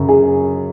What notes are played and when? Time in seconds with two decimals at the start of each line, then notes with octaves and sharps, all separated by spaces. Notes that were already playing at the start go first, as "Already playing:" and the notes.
Already playing: F#2 C#3
0.09 G#4